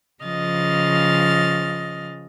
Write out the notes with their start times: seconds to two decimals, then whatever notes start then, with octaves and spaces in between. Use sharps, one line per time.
0.23 C#3 F3 D#5 F6 A6